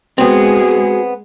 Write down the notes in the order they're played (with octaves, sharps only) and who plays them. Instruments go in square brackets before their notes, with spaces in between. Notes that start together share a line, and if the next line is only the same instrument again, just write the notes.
[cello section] G#3 G#4 [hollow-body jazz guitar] B3 C4 [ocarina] F#4